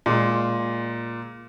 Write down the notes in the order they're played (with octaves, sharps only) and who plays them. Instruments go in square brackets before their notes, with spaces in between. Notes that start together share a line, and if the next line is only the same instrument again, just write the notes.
[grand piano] A#2 G#3